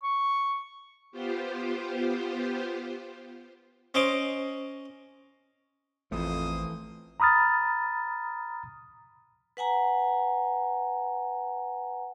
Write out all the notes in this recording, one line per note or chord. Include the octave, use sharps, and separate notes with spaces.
C#6
B3 F4 G4 C5
C#4 C5 D#5 D6
A1 F2 E3 A3 A#3 C5 D#6
A#5 B5 D#6 F6 A6
B4 F#5 G#5 A#5